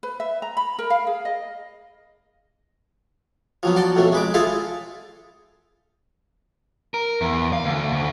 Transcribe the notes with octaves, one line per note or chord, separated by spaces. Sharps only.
B4
E5
A#5
B5
A#4
F5
G#4
D#5
F3 F#3 B3
F#4 D5 A5 C6
B1 F2 F#3 A3
G#3 B4 D6
F4 G#4 A4 C5 E5 F5
A#4
E2
F5
D2
D2